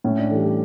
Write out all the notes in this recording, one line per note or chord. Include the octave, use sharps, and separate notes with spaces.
A2 C#4
D4
E3 G3 A4
G4